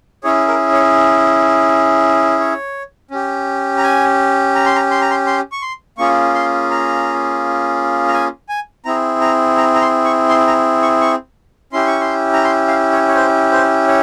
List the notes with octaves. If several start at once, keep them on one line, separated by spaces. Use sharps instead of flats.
C#4 E4 G#4 C#5
A#4
C#5
C#5
C#4 G4
A#5
G#5
A#5
C6
A#5
C6
A#5
C6
C6
C#6
C6
A#3 C#4 F4 G#4 C#6
C6
A#5
A#5
G#5
G#5
C4 E4 G#4 A#5
A#5
A#5
A#5
C6
C#6
C6
A#5
C#6
C#6
C#4 E4 G4 C6
C#6
C6
A#5
C6
F5
C#5
C#5
C5
C5
C#5